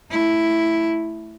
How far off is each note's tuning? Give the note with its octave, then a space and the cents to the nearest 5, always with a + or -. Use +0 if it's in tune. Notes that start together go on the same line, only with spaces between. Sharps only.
A3 +0 E4 +0